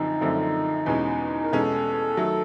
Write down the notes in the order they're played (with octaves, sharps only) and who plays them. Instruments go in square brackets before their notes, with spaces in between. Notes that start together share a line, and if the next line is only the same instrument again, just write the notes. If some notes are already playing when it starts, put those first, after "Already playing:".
Already playing: [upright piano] F#2 D3 F3 C4 [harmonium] D#4
[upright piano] F#2 D3 F3 A3 C4
E2 B2 G#3 C#4
[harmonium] A#4
[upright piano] E2 B2 G#3 C#4 [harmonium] A4
[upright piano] D#3 F#3 A3